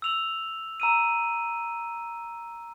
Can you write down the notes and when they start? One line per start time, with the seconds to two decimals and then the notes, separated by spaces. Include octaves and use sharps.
0.02 E6 F7 F#7
0.80 A#5 E6 D#7